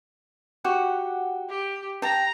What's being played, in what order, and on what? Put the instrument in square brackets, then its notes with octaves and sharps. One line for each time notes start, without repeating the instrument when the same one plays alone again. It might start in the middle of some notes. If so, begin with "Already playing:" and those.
[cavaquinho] F#4 G4 F#5
[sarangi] G4
[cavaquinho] G5 A5 [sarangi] A#5